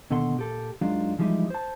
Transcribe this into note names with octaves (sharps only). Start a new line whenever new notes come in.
D#2 B2 D3 A4 F#5 C6
A#2 G4 A4
F#2 F#3 G#3 D4 D#4 F4
E3 F3 G3 G#3 D#4 E4
C5 A5